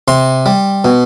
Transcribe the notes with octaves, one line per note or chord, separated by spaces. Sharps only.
C3 C6
G3
B2